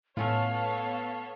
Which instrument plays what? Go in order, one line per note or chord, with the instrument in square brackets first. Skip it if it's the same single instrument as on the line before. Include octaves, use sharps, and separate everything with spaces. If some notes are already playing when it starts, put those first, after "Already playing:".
[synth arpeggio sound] A2 [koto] A3 C#4 F4 [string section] B3 A4 C#5 [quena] F5